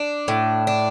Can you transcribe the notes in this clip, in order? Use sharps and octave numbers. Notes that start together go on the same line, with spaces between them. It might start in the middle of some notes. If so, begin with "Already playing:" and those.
Already playing: D4
A2
D4